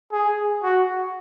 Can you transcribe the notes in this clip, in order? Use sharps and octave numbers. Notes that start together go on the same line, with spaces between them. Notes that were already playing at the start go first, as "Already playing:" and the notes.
G#4
F#4